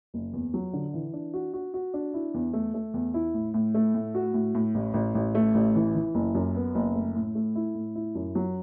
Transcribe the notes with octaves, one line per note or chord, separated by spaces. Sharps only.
F#1
E2
F#3
D3
E3
D4
F#4
F#4
F#4
D4
E4
E2
A3
A3
E2
E4
A2
A2
A3
A2
F#4
A2
A2
A1
A1
A1
A3
A1
E3
E3
F#1
F#2
B3
F#1
A3
A2
A3
E4
A2
E4
F#2
F#3